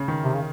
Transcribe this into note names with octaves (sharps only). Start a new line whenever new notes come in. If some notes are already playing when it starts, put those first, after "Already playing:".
Already playing: C#3
D#3
C3
C#3